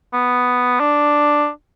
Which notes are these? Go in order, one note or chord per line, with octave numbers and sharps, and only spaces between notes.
B3
D4